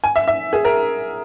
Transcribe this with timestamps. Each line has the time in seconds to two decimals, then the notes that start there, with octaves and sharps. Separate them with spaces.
0.04 G#5
0.16 E5
0.28 E5
0.53 G#4
0.65 A#4